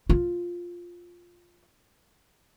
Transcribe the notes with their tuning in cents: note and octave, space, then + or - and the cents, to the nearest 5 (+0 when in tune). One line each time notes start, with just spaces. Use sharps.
F4 +5